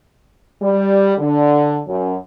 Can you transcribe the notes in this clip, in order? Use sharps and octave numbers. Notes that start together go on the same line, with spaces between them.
G3
D3
F#2